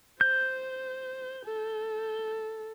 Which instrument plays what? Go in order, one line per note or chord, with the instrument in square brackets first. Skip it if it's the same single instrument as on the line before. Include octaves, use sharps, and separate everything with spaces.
[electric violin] C5 [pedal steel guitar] G6
[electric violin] A4